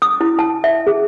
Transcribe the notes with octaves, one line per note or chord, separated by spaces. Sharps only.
D#6
E4
A5
E5
G#4